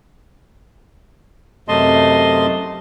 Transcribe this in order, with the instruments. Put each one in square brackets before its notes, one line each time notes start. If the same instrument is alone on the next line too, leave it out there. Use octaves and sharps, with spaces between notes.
[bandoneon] F#2 C3 A3 D#5 A5 C6